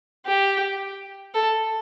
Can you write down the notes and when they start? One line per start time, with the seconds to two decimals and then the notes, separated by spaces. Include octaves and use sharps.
0.26 G4
1.34 A4